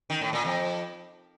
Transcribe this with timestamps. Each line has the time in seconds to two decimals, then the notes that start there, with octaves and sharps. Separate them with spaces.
0.10 D#3
0.21 A2
0.33 A#2
0.45 F2